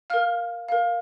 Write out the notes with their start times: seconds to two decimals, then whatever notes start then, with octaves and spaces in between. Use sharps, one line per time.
0.10 A#4 F5 F6
0.69 A#4 F5